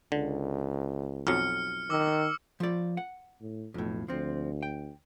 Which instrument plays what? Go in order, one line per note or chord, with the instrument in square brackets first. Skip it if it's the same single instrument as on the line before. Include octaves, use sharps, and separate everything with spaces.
[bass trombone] C#2 [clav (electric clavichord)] D3
[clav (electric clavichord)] B1 F2 F#3 [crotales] F6 C#7
[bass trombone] D#3 [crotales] D6 E6
[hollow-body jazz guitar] F3 D5
F#5
[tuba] A2
[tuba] B1 [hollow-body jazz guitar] F2 A2
[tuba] D2 [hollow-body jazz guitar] F3 C4
[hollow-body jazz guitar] G5